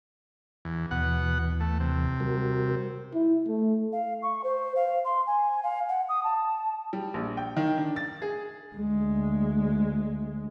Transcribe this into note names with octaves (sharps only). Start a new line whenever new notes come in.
E2
D#2 B2 E3 F#5
A3
C3
G3 F#4 A#4
E4
A3
F5
C#6
C5
F5
C6
G#5
F5
F#5
D#6
A5
G3
A#1
G5
D#3
D4
A6
G#4
D2 G#3